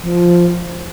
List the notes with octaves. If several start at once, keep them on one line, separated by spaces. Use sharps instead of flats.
F3